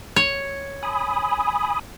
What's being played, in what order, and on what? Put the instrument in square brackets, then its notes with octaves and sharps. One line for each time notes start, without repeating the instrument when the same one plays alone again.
[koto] C#5
[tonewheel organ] G#5 B5 D#6